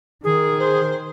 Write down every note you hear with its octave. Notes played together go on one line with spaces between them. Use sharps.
D#3 G#4
C5